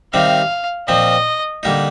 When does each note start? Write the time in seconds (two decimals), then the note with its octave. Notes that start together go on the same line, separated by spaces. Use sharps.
0.13 C3 D#3 G3 C4 D#4 F5
0.88 A#2 F3 C4 D#5
1.63 D3 G3 A#3 D#4